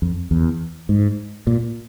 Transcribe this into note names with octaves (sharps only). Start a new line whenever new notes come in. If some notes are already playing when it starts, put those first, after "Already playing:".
F2
E2
G#2
A#2